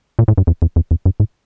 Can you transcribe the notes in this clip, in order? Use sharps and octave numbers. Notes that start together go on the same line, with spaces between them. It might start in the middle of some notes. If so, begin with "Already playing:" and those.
A#2
A2
G2
F2
F2
F2
F2
G2
A2